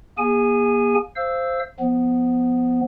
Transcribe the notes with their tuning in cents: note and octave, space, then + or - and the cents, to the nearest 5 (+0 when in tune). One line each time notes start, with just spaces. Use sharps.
A#3 +35 G#4 -30 G#5 +0
C5 +0 F5 -25 E6 +0
F3 +0 B3 +5